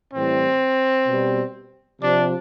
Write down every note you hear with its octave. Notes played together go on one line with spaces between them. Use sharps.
A2 E3 G3 C4
B2 G3
C3 F3 D4